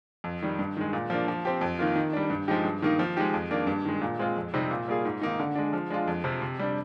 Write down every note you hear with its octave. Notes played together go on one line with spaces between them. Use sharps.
F2
D#3 G3
G2
D#3 G#3
A#2
F3 A#3 D4
F3
C4 G4
F2
D#3 A#3 F4
D#3
G3 D4
G2
F3 G#3 D#4 G4
G2
D#3 A#3 D#4
F3
G#3 D#4 G4
F2
D#3 A#3 D4
G2
D#3 G#3
A#2
G#3 C4 F4
F2
C3 G3 C4 D#4
A#2
G3 A#3 F4 G#4
G#2
D#3 A#3 D#4
D3
G#3 D4
F3
G#3 D4 F4
F2
C3 F3
C3
G3 D4